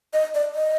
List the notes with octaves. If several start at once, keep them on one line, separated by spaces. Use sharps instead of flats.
D#5
D5
D#5